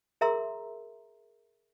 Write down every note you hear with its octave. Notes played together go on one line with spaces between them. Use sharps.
G#4 A#4 E5 A#5 C6 E6